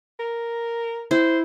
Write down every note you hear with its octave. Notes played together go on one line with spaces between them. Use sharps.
A#4
E4 C5